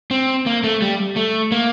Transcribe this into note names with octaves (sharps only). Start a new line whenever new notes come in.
C4
A#3
A3
G3
A3
A#3